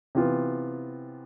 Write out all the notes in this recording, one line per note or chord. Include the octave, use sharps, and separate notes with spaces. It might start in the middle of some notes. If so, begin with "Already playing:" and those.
C3 E3 B3 F4